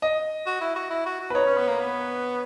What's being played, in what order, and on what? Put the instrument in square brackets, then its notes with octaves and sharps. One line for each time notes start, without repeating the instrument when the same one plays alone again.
[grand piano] D#5
[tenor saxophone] F#4
E4
F#4
E4
F#4
F#4
[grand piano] B4
[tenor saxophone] D#4 [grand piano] C#5
[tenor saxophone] C#4
B3
A#3
B3